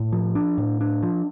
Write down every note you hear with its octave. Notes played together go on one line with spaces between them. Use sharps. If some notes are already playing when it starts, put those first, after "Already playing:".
Already playing: A2
F3
D4
A2
D4
F3